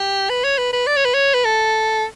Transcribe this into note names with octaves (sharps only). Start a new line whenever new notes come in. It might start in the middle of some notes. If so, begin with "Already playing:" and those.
Already playing: G4
B4
C#5
B4
B4
D5
C#5
B4
C#5
B4
A4